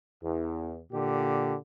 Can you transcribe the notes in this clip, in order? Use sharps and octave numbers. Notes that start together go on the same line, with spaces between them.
E2
A#2 D3 G4